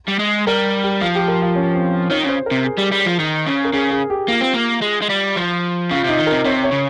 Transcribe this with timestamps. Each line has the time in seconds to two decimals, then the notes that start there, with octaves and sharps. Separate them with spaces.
0.08 G3
0.19 G#3
0.47 G3 A#4
0.83 G4
1.01 F3 F4
1.15 G4
1.28 A#4
1.42 F4
1.55 C#4
1.74 C4
1.92 F4
2.10 D#3 C#5
2.24 C#3 C5
2.46 A#4
2.51 C3
2.64 G#4
2.78 G3
2.92 G3
3.06 F3
3.19 D#3
3.46 C#3
3.65 A#4
3.73 C#3 G#4
3.91 G#4
4.10 G4
4.28 A#3 F4
4.41 C4
4.54 A#3
4.82 G#3
5.02 G#3
5.10 G3
5.36 F3
5.91 C#3 F4
6.04 C3 D#4
6.18 D#3
6.27 A#4
6.32 C3
6.45 C3 C#5
6.64 C#5
6.72 C#3